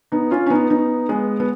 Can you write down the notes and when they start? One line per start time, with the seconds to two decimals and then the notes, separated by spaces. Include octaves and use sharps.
0.12 B3 D#4
0.31 C#4 F4
0.46 C#4
0.50 B3 D#4
0.70 B3 D#4
1.09 G#3 B3
1.40 B3